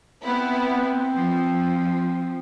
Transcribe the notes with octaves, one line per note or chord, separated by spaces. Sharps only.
B3 C4 E4
F3